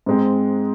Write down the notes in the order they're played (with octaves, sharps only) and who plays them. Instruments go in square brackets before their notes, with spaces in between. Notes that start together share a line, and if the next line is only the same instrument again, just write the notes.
[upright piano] G#2 G#3 C4